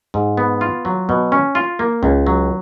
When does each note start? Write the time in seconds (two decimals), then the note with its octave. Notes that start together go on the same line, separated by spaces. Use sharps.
0.14 G#2
0.37 B3
0.61 F4
0.85 F#3
1.09 B2
1.32 C#4
1.55 F4
1.79 A#3
2.03 C#2
2.27 F#3